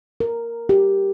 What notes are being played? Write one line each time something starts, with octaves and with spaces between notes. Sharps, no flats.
A#4
G4